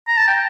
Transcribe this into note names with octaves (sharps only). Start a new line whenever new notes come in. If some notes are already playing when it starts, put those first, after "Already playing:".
A#5
A5
G5